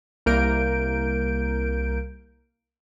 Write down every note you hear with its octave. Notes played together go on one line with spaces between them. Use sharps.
C2 A#3 A#4 G6 D7